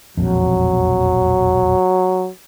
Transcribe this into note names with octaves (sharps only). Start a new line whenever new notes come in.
E1 A#1 F2 F#3